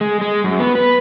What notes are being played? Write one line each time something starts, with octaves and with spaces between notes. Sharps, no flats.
G#3
G#3
F#2
B3
B4